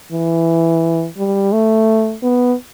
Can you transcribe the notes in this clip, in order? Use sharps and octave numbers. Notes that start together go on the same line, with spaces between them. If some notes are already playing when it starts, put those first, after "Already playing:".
E3
G3
A3
B3